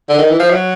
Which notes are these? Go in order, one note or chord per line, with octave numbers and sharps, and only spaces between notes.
D3
D#3
E3
F3
F#3